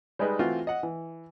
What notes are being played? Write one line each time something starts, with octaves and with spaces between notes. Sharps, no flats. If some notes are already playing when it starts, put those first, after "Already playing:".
G3 G#3 D#4 B4
E3 A3 C4 F4 F#4
D#5 F#5
E3